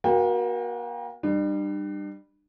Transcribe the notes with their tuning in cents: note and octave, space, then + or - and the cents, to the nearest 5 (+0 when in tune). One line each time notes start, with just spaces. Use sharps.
A#3 +35 F#4 +0 G5 +30
G3 +0 D4 +40